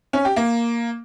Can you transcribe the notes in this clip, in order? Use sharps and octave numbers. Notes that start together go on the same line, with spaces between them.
C#4
G4
A#3